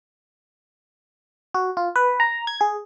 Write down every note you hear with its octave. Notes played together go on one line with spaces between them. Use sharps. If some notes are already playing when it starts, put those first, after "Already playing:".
F#4
F4
B4
A#5
G#6
G#4